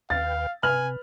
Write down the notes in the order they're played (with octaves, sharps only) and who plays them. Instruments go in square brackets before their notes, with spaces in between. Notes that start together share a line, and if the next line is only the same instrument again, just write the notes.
[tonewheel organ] D#2 B4 G5 [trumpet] F5 [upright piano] A6
[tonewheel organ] C3 [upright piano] B4 F6 F#7 [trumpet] G#5